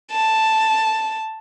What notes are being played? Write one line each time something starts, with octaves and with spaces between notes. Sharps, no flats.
A5